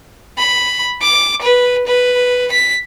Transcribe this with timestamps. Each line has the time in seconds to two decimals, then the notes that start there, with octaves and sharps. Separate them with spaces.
0.38 B5
1.02 D6
1.42 B4
1.87 B4
2.52 B6